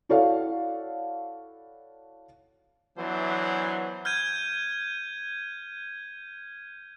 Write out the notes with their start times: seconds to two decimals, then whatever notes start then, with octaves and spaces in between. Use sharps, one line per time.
0.09 E4 F#4 A4 C#5 D5 F5
2.97 E3 F#3 B3 D4 C5
4.05 F6 G6 G#6 D#7